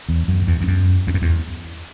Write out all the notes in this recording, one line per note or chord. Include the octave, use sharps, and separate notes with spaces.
E2
F#2
E2
E2
F#2
E2
F#2
E2